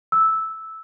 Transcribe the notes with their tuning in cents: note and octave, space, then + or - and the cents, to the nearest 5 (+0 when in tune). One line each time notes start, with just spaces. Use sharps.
E6 -10